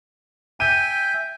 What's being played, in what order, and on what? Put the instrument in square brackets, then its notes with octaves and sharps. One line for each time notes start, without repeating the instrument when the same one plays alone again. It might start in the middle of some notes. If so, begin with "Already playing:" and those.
[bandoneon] E5 G5 G#5 [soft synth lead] G6 [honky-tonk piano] D#7